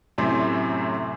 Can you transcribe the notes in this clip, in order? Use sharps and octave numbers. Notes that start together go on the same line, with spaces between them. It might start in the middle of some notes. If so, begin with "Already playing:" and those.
F#2 A2 C3 C4